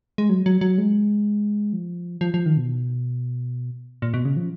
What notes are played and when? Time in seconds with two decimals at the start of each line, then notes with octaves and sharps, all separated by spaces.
0.18 G#3
0.29 F#3
0.46 F#3
0.61 F#3
0.78 G#3
1.73 F3
2.21 F3
2.34 F3
2.46 D#3
2.57 B2
4.02 A#2
4.14 B2
4.25 C#3
4.37 F3